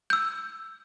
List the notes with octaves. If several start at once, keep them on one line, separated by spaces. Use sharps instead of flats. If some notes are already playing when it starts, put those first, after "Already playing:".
E6 G6